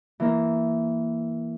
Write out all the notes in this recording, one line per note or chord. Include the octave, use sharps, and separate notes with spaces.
E3 A#3 A#4